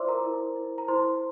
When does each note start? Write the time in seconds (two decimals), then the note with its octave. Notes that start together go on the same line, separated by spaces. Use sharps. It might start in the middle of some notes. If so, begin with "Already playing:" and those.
Already playing: E4 F4 C5 D5 E5 C6 D6 E6
0.08 A#4 A#5
0.24 E4
0.56 E4
0.78 A#5
0.88 E4 C5 C6